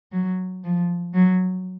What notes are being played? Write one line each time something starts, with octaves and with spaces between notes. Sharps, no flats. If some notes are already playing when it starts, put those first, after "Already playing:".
F#3
F3
F#3